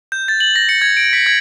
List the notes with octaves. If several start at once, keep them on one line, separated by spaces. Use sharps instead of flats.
G6
A6
F#7
A#6
C#7
G#6
D7
B6
G#6